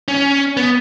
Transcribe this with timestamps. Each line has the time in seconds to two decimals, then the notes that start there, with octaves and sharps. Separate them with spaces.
0.08 C#4
0.57 B3